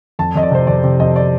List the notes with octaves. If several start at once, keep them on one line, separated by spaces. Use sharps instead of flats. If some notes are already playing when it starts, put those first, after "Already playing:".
F2 A5
F2 D#5
D5
C3 C5
F2 D5
C3
F2 D#5
D5